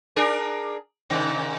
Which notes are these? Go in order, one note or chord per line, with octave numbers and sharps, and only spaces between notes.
D4 G#4 A#4
G#2 C3 D#3